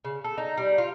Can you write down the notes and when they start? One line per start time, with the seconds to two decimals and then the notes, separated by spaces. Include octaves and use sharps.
0.05 C#3
0.24 A4
0.38 D#4
0.58 G3
0.78 F4